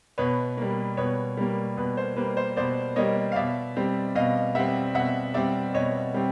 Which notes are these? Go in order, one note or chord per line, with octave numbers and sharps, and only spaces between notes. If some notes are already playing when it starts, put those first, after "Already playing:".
B2 B4 C#5
G3 A#3
B2 B4 C#5
G3 A#3
B2 B4
C5
G3 A#3 B4
C5
B2 C5 D5
G3 A#3 C#5 D#5
F5
B2 D5 E5
G3 C4
B2 D#5 F5
G3 C4 E5 F#5
B2 E5 F#5
G3 C4 D5 E5
B2 C#5 D#5
G3 C4